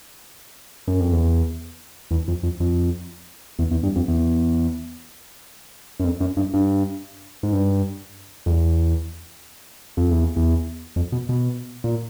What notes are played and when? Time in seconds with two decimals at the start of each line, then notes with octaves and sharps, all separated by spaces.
0.88 F#2
1.00 F2
1.12 E2
2.11 E2
2.28 F2
2.43 F2
2.60 F2
3.59 E2
3.71 E2
3.83 G2
3.96 F2
4.08 E2
6.00 F#2
6.04 F2
6.20 F#2
6.37 G2
6.54 G2
7.43 G#2
7.53 G2
8.46 F2
8.50 E2
9.97 F2
10.11 E2
10.36 E2
10.96 F2
11.12 B2
11.29 B2
11.84 A#2